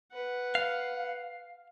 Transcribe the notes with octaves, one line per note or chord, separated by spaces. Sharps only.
B4 F#5
F5